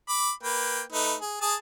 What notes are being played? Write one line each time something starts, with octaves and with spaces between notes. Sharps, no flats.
B5 D6
A#3 B4 G5
A3 D#4 B4
G#4
G#4 A5 D#6